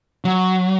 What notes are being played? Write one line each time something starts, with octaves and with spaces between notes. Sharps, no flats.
F#3